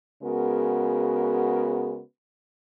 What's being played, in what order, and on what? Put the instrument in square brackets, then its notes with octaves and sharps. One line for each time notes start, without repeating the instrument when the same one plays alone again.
[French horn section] C#3 G#3 B3 F#4 A#4